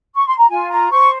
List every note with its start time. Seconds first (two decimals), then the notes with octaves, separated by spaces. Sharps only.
0.14 C#6
0.26 C6
0.38 A#5
0.49 F4 G#5
0.70 A#5
0.91 C5 C#6